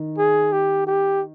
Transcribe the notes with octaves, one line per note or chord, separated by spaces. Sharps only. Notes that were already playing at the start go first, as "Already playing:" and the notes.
Already playing: D#3
G#4
G4
G4